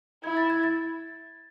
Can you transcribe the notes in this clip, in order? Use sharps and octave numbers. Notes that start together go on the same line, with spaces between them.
E4 G#6
A6
G#6
A6